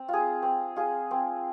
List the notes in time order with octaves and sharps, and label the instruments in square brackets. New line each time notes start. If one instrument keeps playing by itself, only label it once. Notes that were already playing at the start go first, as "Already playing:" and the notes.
Already playing: [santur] C4
F4 G#4
C4
F4 G#4
C4